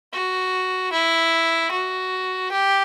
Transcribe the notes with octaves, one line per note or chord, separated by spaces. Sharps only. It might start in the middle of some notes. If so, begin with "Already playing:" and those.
F#4
E4
F#4
G4